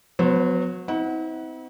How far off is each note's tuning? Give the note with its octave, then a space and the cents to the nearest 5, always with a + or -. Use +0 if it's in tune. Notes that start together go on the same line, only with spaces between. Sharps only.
F#3 -25 B3 +20 C5 +30
C4 -20 E4 -45 F#5 +0